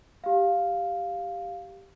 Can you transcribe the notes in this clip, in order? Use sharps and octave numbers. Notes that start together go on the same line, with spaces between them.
G4 F5